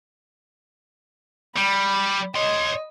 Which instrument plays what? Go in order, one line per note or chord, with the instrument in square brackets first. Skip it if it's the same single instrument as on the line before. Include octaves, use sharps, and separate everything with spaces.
[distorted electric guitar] G3 [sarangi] B5
[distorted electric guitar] C#5 C6 [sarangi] D#5